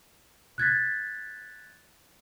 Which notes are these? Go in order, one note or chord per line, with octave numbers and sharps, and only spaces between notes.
F#6 G#6 A6 B6